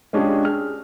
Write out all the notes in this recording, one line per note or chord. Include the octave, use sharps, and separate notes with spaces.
G#3 C#4 D4 F4 G4 G#4
G#4 F6